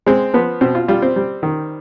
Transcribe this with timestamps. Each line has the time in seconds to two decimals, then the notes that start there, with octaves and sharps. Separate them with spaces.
0.07 G#3 C4
0.34 F3 B3
0.61 B2 C4
0.75 F4
0.88 G3 F4
1.02 C4
1.16 G3
1.43 D#3